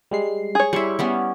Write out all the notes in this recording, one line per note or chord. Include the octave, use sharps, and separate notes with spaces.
G3 G#3 C7
G#4 C#5
G3 E4 E5 C6 C#6
G3 B3 C#4